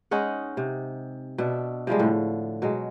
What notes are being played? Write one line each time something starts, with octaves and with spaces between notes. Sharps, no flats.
G#3 C#4 D#4 F#5
C3
B2 D4 E5
C3 F3 G3 G#3
A2 D3
B2 F#3 G#3